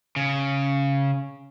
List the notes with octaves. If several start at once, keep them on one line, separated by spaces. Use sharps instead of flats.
C#3